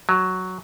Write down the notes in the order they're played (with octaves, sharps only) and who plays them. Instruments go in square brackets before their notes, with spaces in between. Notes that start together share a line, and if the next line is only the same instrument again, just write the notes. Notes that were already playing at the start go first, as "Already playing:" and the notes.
[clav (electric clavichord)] F#3